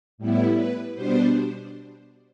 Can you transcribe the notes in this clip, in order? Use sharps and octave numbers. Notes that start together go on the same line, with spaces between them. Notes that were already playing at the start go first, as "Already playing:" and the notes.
A2 G3 B3 E4
B4
B2 G3 B3 D4 C5